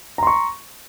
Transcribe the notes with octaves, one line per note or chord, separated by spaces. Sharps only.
A#5 C6 C#6